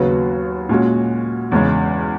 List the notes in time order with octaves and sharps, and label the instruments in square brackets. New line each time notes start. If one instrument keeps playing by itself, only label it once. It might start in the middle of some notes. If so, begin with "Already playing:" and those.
Already playing: [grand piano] D#2 C#3 F#3 B3 F#4
A#2 G#3 C#4 F#4
E2 C#3 G#3 C#4